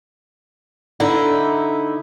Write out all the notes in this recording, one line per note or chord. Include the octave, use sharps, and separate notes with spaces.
D3 D#4 E4